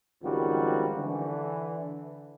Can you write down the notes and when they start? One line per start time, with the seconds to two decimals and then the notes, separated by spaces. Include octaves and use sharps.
0.23 G#1 C#2 D#3 F3 G3 F#4
0.98 D3 E3